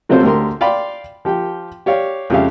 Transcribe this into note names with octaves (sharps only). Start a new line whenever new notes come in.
C3 F#3 A3 C4 F4 C5
D2 G4 A#4 C6
D5 F5 G5 B5 C6
F3 G4 G5
G4 C#5 D5 F5
F2 C#3 G#3 G4 E5 F5